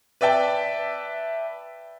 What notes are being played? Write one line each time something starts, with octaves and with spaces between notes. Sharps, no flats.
B4 D5 E5 G5 A5